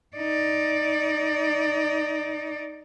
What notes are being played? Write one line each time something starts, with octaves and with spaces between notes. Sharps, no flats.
D#4 D5